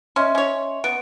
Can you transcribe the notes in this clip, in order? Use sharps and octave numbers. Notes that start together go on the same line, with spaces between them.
C#4 D#5 E5 C6
C#4 C#5
B3 D7